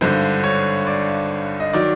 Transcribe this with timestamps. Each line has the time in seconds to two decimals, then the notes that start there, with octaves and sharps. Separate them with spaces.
0.01 G#1 G2 D3 C5
0.44 C#5
0.87 D5
1.60 D#5
1.73 D#3 F#3 D5